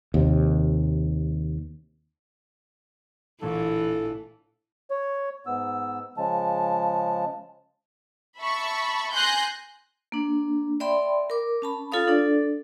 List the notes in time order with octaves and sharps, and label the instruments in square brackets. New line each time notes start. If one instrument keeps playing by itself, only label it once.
[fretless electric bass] D#2 C3
[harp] A1 A#2 D4 [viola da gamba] E3 [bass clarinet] A4
[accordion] C#5
G#2 B3 E6
C#3 F3 G#3 A5
[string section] E5 A5 B5 C#6
G#5 C6 F#6 G6 A#6 C7
[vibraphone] A#3 D4
D5 E5 G5 B5 C6
A#4 D6
C#4 A5 B5
F4 A4 C#5 F5 D#6
D4 A4 D5